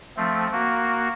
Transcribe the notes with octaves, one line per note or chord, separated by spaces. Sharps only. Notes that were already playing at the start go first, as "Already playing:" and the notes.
F3 A3 C4
A#3 F#4